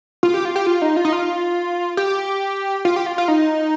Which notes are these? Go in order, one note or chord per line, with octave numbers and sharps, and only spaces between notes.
F4
G4
F4
G4
F4
D#4
F4
D#4
F4
G4
F4
G4
F4
F4
D#4